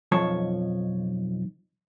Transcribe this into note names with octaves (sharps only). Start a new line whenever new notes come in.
B1 F2 F3 C#5 A5